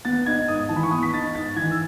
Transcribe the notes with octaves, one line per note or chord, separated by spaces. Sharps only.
B3 A6
D#4 G#6
G#2 D#6
E3 A5
B5
C#6
B3 D#6
B6
D#4 A6
G#2 A6
E3 G#6
E6